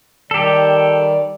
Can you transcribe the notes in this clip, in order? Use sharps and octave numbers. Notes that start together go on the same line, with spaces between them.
D#3 G3 G4 A4 D5